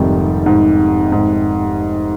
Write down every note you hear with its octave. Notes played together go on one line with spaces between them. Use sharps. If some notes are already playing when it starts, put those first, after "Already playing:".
Already playing: F1 F2 G#2 D#3 G3
G#2
G#2